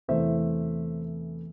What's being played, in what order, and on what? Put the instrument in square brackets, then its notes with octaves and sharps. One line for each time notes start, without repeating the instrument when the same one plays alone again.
[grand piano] E2 C3 E3 A3 E4 C5 E5